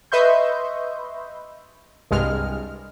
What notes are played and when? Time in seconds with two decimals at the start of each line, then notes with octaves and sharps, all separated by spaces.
0.12 B4 D#5 E5 C6 C#6 G6
2.11 C2 G2 G#3 F6